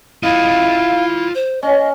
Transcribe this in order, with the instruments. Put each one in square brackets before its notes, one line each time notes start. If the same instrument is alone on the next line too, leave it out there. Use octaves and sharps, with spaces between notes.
[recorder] E4 [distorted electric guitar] F4 D#5 [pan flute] F5
[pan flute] C5
[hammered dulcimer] C#4 [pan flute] D#5